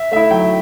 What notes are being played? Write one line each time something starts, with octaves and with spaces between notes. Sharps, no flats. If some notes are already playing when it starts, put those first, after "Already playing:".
Already playing: E5
A3 E4 E5
F#3 G5